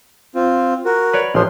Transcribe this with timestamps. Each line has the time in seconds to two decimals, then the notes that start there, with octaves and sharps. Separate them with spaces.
0.35 C4 F4
0.85 F#4 A#4
1.13 B4 C#5 D5
1.35 A1 F3 C6